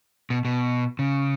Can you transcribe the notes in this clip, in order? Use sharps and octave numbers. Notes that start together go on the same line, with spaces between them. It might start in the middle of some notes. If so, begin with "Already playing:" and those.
B2
B2
C#3